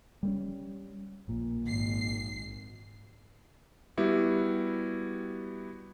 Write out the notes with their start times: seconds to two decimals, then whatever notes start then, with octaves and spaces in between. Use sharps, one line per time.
0.23 G3 A3 C#4
1.28 A#1 A#2
1.64 G#1 C7
3.97 G3 B3 E4 F#4 G4